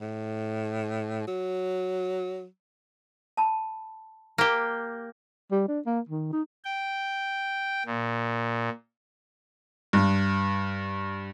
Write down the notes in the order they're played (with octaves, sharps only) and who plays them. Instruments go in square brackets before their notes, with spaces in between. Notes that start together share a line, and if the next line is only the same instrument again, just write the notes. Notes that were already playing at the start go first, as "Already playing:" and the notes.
[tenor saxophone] A2
F#3
[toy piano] A5 B5
[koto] A#3 G4
[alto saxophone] G3
D4
A#3
D#3
D#4
[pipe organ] G5
A#2
[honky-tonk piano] G2